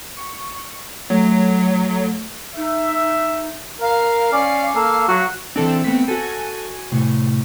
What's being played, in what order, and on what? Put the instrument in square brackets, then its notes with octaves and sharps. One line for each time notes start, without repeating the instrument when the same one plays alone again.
[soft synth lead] C#6
[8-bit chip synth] F#3 [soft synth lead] A3
[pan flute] D#4 [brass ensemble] E5
[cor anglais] A#4 [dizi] F5
[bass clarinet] C#4 [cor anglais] D5
[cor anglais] A#3 [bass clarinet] A4
[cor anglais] F#3 [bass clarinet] F#4 [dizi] F5
[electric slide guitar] E3 D4 [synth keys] C4 A4
[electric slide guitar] A3 B3 [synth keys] C4 B6
[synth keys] F#4 G#5 [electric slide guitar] A4
[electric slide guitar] A2 C3